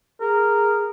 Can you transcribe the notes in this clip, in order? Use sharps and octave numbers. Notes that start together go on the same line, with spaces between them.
G#4 A#4